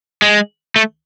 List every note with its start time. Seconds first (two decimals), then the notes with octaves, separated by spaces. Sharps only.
0.22 G#3
0.76 A3